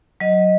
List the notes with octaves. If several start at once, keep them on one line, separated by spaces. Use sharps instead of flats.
F#3 D#5